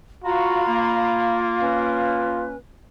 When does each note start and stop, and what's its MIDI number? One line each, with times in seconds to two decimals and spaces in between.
0.24 2.46 65
0.24 0.65 66
0.24 1.39 77
0.24 1.39 82
0.24 1.39 83
0.67 2.58 58
1.60 2.55 61
1.60 2.55 71